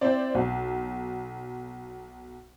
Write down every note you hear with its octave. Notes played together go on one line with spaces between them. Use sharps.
C4 E4 C5 D5
B1